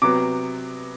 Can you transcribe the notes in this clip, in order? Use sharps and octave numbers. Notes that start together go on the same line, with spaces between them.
C3 F#3 B3 D6